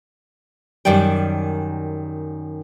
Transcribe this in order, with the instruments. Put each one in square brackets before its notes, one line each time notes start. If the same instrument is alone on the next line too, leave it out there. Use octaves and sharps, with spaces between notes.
[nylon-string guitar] F#2 D#3 G3 D5 G5